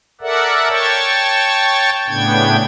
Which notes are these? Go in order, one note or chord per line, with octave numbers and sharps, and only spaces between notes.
A4 A#4 D5 E5 F#5
C#5 G5 A5 C#6
A2 C#3 B3 D4 G5 G#6